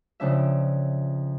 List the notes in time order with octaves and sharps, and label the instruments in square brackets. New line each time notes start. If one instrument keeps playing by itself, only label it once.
[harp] F2 C#3 D4 E5